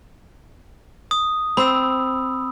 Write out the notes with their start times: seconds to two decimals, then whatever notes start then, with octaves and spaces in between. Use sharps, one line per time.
1.11 D#6
1.57 C4 B5 E6